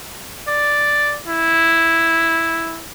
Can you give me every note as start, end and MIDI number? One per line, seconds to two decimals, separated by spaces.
0.48 1.17 74
1.28 2.86 64